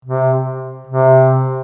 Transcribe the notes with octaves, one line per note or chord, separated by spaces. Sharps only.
C3
C3